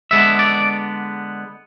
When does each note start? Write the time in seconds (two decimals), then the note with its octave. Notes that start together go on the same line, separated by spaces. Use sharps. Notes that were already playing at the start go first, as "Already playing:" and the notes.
0.11 D3 G#3 B3 E5
0.39 D5